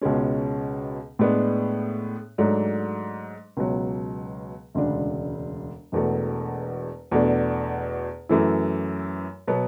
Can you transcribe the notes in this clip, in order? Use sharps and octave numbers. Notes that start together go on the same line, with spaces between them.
C#2 B2 G#3 C#4
A2 G#3 B3 D4
G#2 F#3 A3 D4
C#2 B2 F#3
E1 D2 C#3 G#3 D4
E1 E2 B2 A3
E2 B2 A3 D4
F#2 E3 A3 E4
B2 F#3 B3